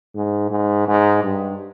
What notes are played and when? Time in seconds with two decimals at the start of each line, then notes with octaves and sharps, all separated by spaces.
0.16 G#2
0.51 G#2
0.88 G#2
1.23 G2